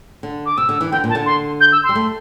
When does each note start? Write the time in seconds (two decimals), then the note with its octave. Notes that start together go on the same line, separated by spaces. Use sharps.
0.23 D3
0.46 D6
0.57 C3 E6
0.69 D3
0.81 E3
0.91 D3 G5
1.04 A#2
1.10 A5
1.15 D3
1.26 C6
1.61 G6
1.72 E6
1.84 C6
1.89 G3
1.95 A3